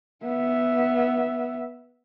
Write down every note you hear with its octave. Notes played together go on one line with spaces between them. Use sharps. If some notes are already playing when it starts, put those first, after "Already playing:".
B3 E5